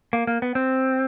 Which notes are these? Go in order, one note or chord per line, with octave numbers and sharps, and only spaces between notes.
A#3
A#3
B3
C4